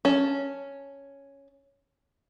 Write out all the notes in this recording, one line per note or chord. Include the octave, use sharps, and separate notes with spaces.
C#4 A5